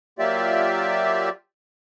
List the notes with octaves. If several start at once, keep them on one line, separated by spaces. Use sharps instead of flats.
F#3 A#3 F4 G4 D5 E5